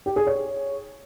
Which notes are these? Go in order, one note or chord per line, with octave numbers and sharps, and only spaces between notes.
G4
G#4
C#5